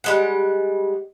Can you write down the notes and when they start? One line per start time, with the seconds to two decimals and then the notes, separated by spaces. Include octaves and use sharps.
0.04 G3 G#3 F#5